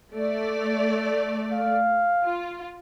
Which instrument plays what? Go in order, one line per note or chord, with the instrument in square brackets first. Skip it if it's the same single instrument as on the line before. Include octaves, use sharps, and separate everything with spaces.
[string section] A3 D5
[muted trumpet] F5
[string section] F4